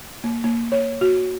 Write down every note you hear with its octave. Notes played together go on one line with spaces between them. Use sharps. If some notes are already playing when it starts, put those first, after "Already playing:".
A#3
A#3
C#5
F#4